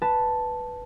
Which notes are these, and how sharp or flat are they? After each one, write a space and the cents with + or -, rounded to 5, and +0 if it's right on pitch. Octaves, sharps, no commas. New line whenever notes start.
B4 +0 A5 +0